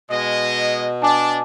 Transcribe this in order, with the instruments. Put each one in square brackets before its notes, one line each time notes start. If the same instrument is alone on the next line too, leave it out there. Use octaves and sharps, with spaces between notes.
[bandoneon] B2 [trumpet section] G#3 D#5
[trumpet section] D4 [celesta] G#5 A5 D6